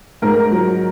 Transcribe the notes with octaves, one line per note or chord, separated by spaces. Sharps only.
G#2 A#4
F#3